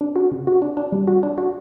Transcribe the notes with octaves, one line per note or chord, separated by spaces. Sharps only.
D4
F#4
C#3
F#4
D4
D4
G3
F#4
D4
F#4